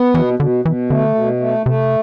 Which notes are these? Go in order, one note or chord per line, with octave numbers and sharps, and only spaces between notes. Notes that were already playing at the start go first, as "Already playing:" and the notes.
Already playing: B3
B2 E3
B2 D3
B2 E3
D3 A3
B2
A3
C3 A3